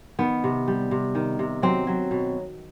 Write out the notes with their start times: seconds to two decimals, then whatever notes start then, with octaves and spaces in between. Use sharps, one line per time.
0.19 D#3 B3
0.44 C3
0.68 G3
0.91 C3
1.15 D#3
1.39 C3
1.62 F#3 C4
1.87 F#3
2.11 B2